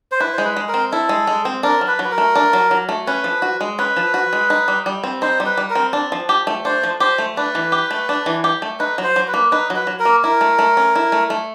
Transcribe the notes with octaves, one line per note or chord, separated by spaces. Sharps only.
C5
E4 B4
C5
G#3
B4
G#3
A#4
C4
E4 A4
G#3
G#3
C4
D4 A#4
F#3
B4
F#3
B4
A#4
A3
D4
F#3
F#3
A3
C#4 B4
F3
F#4
G#3
C#4 B4
F3
F#4
G#3
D#4
G3
G3
C4
D#4 C5
G3
B4
G3
A#4
C4
D4
F3
G4
A3
D4 C5
F3
G4 C5
A3
D4 B4
E3
G4
A3
D4
E3
G4
A3
D#4 B4
F#3
C5
F#3
B4
A#3
D#4 B4
F#3
B4
F#3
A#4
A#3
E4 A#4
A3
A3
C#4
E4
A3
A3